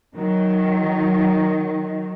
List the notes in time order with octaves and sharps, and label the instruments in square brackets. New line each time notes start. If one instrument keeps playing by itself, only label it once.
[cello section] D#3 F#3